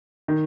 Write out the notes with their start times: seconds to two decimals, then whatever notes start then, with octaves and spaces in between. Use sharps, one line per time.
0.28 D#3